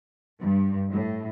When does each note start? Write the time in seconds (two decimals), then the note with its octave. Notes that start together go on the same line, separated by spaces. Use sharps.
0.39 G2
0.90 A2